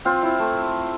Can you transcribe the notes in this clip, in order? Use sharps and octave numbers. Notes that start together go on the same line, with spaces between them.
C4 F4
E4
A3